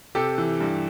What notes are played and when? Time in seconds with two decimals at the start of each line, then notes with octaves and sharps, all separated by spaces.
0.15 C3 G4 A4
0.38 E3
0.60 G2